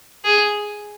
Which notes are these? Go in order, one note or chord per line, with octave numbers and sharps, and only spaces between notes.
G#4